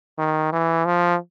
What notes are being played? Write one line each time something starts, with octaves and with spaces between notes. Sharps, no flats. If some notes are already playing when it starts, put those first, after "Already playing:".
D#3
E3
F3